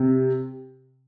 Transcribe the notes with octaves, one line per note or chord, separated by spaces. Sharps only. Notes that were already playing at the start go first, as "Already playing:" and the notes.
Already playing: C3